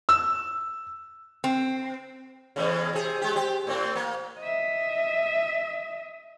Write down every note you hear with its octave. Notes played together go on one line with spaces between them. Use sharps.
E6
C4
E2 A2 C#3
C3 G#4
G#3 G4
C4 G4
A2 C4
A#3
D#5 E5